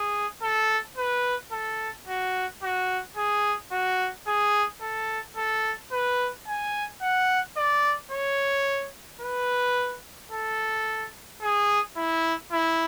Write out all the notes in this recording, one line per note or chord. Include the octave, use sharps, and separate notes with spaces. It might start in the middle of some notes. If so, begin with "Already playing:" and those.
Already playing: G#4
A4
B4
A4
F#4
F#4
G#4
F#4
G#4
A4
A4
B4
G#5
F#5
D5
C#5
B4
A4
G#4
E4
E4